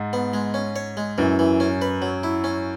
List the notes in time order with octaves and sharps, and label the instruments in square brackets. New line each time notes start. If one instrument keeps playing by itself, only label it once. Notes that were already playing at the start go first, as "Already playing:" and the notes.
Already playing: [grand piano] G#2
[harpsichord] B3
G#3
C#4
C#5
G#3
[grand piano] F#2 [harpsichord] E3
[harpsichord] E3
C#4
B4
F#3
E4
C#4